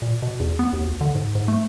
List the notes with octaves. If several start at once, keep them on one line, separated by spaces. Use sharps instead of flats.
A#2
B2
E2
B3
D#2
D2
D3
G#2
G#2
A3